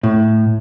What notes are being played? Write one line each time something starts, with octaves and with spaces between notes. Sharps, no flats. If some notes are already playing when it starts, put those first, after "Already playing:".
A2